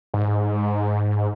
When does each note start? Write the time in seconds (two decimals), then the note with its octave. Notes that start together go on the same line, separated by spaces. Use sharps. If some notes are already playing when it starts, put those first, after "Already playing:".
0.14 G#2